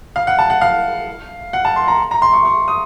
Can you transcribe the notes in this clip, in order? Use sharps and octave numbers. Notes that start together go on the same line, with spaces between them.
F5
F#5
A5
F#5
F5
F#5
A5
C6
A#5
A#5
C6
C#6
C#6
D#6